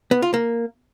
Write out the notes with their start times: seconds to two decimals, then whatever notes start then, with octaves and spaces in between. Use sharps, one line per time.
0.11 B3
0.22 F4
0.34 A#3